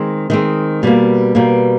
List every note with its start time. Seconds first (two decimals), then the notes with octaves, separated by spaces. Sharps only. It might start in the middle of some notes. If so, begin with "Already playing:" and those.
Already playing: D#3 G#3 C4
0.30 D#3 G#3 C4
0.83 B2 G3 A#3
1.35 B2 G3 A#3